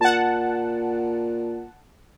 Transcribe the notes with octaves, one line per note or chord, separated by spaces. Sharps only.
A#2 F#5 A5